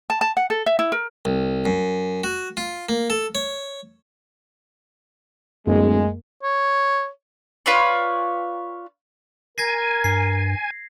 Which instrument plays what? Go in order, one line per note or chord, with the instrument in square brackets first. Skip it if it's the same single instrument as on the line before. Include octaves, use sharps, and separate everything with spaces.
[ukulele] A5
A5
F#5
A4
E5
E4
A#4
[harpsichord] C2
F#2
F#4
F4
A#3
A4
C#5
[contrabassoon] D1 [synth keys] F#2 A#3 [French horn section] G#3
[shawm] C#5
[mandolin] F4 B4 C#5 D5
[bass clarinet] A#4 [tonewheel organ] G#5 [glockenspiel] G#6 A#6 C7
[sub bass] G2 [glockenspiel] C7